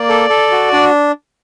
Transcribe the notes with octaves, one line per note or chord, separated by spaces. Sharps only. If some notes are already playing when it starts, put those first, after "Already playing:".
Already playing: A#3 D5
A4
A4
F#4
D4